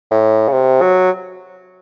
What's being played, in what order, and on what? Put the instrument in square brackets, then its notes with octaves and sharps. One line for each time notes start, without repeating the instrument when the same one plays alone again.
[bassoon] A2
C#3
C3
F#3